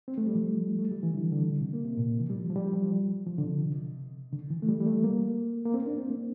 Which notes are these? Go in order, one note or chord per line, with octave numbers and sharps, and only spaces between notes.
C4
A3
G3
F3
A3
G3
E3
D3
D3
C3
C3
A#3
C3
A#2
E3
G3
F3
F3
G3
F3
F3
D3
C3
D3
E3
A3
G3
G3
A3
A#3
A#3
C4
D4
C4
A#3